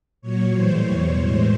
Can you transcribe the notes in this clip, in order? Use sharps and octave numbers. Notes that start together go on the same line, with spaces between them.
A#2 F#3 C#5
A2 E3 G3 C5
E2 B2 G3 C#5
A2 E3 G#3 C5